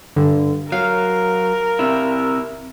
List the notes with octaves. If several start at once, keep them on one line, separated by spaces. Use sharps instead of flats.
G2 D3
F#3 A#4 F5
C3 E4